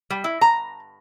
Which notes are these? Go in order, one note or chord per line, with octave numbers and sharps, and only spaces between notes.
G3
E4
A#5